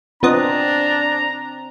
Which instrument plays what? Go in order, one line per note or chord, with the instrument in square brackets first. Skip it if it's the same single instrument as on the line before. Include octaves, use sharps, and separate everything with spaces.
[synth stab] F3 B3 D#5 [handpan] C4 [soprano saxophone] D4 [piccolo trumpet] A#5